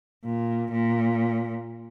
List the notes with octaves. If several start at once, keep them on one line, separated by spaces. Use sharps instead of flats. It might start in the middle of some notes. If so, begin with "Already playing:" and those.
A#2
A#2